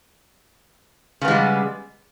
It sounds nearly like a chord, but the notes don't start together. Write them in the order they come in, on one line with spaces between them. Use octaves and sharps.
C#3 B3 G#3 G3